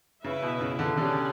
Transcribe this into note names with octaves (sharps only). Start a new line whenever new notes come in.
C#3 C#4 E4 B4 E5
B2
C#3
D3
D3 C#4 G4 D5